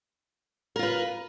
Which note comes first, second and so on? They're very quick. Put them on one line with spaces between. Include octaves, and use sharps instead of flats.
A#4 F4 B4